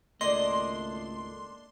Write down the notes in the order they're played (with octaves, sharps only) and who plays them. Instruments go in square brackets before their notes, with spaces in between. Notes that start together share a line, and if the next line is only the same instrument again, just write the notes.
[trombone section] G#1 C#2 A3 [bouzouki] A#3 D4 D5 [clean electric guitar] D#5 [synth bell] C6